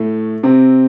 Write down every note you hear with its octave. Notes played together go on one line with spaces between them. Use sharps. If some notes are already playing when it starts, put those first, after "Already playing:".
Already playing: A2 A3
C3 C4